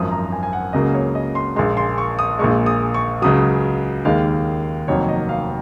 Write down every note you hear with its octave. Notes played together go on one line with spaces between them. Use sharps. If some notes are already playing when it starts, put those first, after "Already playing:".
Already playing: G#1 F#2 F3 D#6
A#5
G#5
G#5
F#5
C#2 C#3 F#3 A#3 D#5
C#5
D#5
C6
A#1 A#2 G#3 C6
C6
C#6
D#6
A#1 A#2 G#3 C#6
D#6
C#6
C#2 C#3 F#3 D#6
D#2 D#3 G#3 F5
F1 F2 D#3 F#3 A#3 C#5
D#5
F5